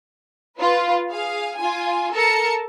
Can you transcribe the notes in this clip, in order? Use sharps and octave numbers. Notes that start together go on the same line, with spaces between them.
F4 B4
G#4 F5
F4 G#5
A4 A#4 A5 C#7